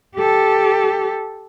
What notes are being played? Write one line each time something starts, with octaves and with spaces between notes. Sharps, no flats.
G4 A4